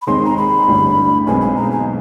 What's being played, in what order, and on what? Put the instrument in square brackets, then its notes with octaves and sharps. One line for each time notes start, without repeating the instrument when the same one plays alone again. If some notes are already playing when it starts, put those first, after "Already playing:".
[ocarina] B5
[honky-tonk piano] D#2 D#3 G#3 C4 [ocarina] C6
[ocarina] A#5
B5
[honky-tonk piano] A1 G2 D3 G3
[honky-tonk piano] B1 B2 G#3 C4 [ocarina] G#5
[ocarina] G#5
A#5
G#5